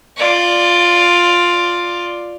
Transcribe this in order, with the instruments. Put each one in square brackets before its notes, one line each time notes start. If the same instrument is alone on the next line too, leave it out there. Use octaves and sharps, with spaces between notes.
[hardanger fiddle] F4 D5